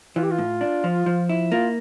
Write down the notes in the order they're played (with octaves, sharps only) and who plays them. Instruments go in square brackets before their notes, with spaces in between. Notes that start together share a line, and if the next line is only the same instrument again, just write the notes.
[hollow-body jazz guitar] E3 [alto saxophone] F4
[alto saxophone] G4
F4
[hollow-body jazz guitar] A2
D4
F3
F3
E4
[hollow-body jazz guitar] A#3 [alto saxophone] F4